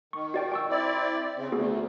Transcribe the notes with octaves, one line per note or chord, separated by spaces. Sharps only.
D#3 C#6
F#4 D5 G5
G5 C#6 E6
C4 E4 D5
C#3 C4
D2 B3 F#4 G#4